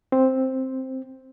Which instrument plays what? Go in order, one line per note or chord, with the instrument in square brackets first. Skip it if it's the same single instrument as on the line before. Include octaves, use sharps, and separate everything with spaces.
[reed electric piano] C4